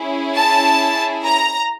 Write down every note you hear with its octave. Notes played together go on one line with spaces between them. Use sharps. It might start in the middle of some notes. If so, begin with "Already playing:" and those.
Already playing: C#4 E4 G#4
A5
A#5